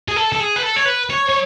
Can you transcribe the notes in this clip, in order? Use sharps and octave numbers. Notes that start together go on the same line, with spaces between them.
G#4
A4
A4
G#4
B4
A4
C#5
B4
C#5
C#5